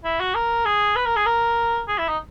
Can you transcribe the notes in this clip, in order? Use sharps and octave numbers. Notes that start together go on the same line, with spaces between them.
E4
F#4
A#4
G#4
B4
A#4
G#4
A#4
G#4
E4
D#4